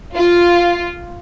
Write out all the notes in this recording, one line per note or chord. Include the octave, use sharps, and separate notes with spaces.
F4